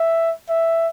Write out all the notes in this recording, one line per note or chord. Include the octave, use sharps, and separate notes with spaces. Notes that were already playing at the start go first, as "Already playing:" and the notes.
Already playing: E5
E5